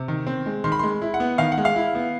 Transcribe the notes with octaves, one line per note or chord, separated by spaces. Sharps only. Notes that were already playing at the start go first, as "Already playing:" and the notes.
Already playing: C3
D#3
C4
G#3
D#3 C6
B5
G#3 C6
E4
F#5
B3
D#3 F5
F#5
G#3
F5
E4
B3